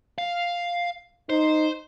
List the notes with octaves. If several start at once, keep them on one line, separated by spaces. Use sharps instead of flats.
F5
D#4 C5